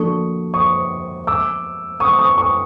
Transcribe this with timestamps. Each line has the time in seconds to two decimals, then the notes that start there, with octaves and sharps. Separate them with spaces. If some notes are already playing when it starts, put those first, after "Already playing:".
Already playing: F3 A#3 D4 F#4 A4 C#6 D#6
0.54 C#6 D#6
1.27 D6 E6
2.00 C#6 D#6
2.19 C#6 D#6
2.38 C#6 D#6